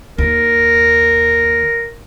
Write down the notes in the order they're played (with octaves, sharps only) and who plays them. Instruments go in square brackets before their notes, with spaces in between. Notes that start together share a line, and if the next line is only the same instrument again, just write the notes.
[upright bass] D#2 [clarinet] A#4